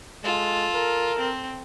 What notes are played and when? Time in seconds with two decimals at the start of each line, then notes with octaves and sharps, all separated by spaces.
0.23 G#3 F4 A4
0.74 A#4
1.19 C4